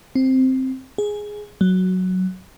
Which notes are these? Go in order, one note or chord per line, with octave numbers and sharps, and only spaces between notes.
C4
G#4
F#3